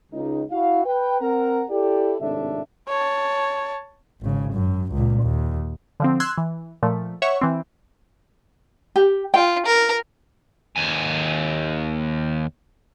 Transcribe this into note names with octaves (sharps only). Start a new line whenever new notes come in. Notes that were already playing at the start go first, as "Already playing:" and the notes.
C#2 D#4
E4 F#4 F5
B4 G5
C4 A#4 F#5 A#5
E4 G4 A4 D5
G#1 A2 C3 D4 A4 E5
C#5 A5
G#1 C#3
F#2
C#2 A#2
D#2
D3 F3 C4
C6 E6 F#6 G#6
E3
A#2 F3 A3
C#5 E5 F#5 C#6
E3 C4
G4
F4 G5
A#4
D#2 G#5